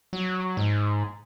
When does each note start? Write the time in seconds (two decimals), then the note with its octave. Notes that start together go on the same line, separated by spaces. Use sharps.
0.13 F#3
0.57 G#2